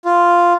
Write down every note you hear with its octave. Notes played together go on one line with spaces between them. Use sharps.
F4